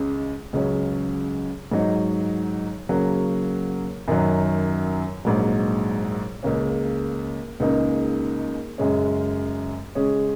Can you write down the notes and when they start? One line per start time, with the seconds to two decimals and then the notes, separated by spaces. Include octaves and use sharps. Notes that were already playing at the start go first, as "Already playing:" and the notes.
Already playing: C#2 C#3 G#3 C#4
0.53 C#2 C#3 F#3 C#4
1.72 G#2 F#3 D#4
2.89 C#3 F#3 A#3
4.08 F#2 D#3 F#3
5.25 A#1 G#2 F#3
6.43 C#2 C#3 A#3 C#4
7.60 C#2 C#3 A#3 D#4 G#4
8.78 F#2 C#3 G#3 C#4
9.95 C#3 G#3 C#4 G#4